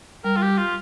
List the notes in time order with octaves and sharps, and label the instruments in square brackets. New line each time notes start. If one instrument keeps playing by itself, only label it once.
[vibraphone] G3 [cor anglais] A#4
[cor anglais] F4
G4
F4